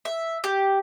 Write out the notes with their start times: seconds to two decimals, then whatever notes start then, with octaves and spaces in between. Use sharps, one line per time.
0.05 E5
0.44 G4